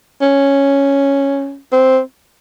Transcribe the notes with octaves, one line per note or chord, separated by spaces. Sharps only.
C#4
C4